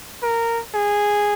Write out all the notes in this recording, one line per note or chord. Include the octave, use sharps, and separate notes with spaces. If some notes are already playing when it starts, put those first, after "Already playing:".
A#4
G#4